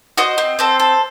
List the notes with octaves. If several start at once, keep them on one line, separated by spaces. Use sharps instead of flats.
F#4 C5 D#5
C4
C4 A4 C5
A4